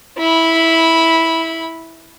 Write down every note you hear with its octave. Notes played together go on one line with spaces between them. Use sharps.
E4 B5